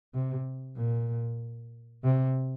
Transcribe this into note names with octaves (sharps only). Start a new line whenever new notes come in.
C3
A#2
C3